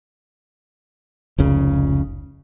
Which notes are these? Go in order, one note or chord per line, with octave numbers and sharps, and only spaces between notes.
F1 C#2 C#3